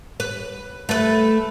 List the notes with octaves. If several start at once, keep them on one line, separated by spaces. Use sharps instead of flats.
B4
A3 B4